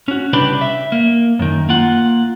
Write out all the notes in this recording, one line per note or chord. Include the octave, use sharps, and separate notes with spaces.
C#4 F#4
C2 C#3 D4 G4 B4 B5
E5
A#3
F#2 D#3
A#3 F4 F#5